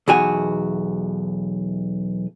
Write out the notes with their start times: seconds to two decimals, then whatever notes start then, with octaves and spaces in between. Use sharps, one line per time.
0.08 B1 E2 F#4 G#5